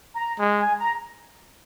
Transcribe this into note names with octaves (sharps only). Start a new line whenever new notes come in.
A#5
G#3
G#5
A#5